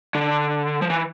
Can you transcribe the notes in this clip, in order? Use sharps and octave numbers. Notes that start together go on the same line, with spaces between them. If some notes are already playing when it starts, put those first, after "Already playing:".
D3
F3
E3